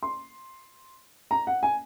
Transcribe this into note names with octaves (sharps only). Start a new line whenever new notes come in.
C6
A#5
F#5
G#5